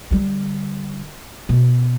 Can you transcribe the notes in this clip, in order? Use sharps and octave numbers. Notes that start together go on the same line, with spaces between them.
D3 G3
B2